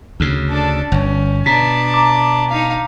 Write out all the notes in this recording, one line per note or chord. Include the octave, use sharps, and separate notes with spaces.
D2 C#3
D4 A4
G1 C#4
B2 D4 A5 A#5 B6
A#5 D6
D#4 F5